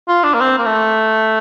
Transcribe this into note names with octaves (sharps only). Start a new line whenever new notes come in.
F4
D4
A#3
C4
A#3
A3